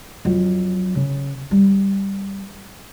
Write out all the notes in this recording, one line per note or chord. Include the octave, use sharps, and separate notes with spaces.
F2 F#3
C#3
G3